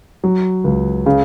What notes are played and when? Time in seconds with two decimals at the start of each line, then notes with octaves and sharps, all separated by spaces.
0.24 F#3
0.64 C#2
1.06 C#3